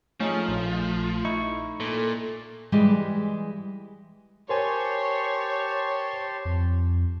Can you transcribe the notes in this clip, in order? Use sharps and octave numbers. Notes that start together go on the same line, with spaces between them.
F3 A3 C#4 D#4 G#4
A#1
D#4 E4 C#6
A#2 A4
E3 G3 G#3 G4
G4 A#4 C5 C#5 G#5 A5 C6
F2